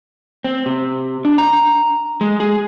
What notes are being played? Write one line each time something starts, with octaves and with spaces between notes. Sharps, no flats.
C4
C3
D4
A#5
G#3
G#4